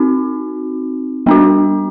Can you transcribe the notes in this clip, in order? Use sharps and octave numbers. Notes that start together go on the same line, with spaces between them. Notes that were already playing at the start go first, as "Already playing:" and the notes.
Already playing: C4 D#4 F#4
G3 B3 D4 F#4